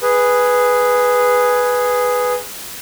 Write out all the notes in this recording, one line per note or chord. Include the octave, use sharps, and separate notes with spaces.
G#4 B4